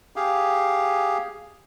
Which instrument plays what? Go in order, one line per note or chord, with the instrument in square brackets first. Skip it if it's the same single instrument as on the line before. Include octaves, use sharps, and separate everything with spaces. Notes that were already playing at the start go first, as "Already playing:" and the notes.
[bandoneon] G4 G#4 F5